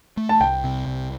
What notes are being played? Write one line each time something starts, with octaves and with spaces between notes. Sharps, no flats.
A3
A5
C2 G5
C3
C2